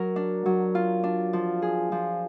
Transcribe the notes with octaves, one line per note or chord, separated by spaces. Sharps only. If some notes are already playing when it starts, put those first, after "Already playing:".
Already playing: F#3 A#4
D4
F#3
F4
D4
F3
G#4
F3